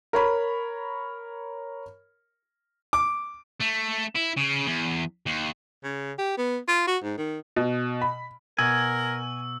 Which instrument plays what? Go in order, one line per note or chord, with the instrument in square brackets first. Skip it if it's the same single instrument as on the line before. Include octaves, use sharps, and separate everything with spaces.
[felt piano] A#4 C#5 B5
[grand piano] D6
[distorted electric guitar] A3
E4
C#3
E2
D#2
[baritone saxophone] C#3
G4
B3
F4
F#4
G#2
D#3
[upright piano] B2
B5
[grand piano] B2 [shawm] A#4 [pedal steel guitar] G#5 [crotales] E6